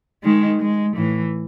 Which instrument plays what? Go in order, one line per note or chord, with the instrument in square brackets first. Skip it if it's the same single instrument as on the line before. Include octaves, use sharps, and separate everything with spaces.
[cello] D#3 [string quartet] G#3
[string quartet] G#3
[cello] A2 [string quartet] E3